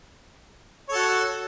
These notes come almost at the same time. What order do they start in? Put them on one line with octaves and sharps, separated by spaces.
C#5 A4 F#4